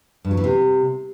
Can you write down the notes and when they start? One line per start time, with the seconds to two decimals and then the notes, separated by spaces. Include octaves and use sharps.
0.24 G2
0.31 F#3
0.37 E3
0.44 C3